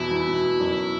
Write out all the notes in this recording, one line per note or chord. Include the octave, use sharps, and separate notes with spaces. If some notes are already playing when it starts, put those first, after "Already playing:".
Already playing: E2 B2 E4
E2
B2
B2
F#1